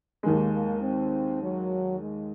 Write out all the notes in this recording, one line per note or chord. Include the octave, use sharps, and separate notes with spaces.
D#2 D#3 G#3 A#3
A#3
C4
F#3
G#3